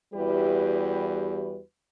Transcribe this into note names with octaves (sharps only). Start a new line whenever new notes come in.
E2 G3 E4 F#4 G4 B4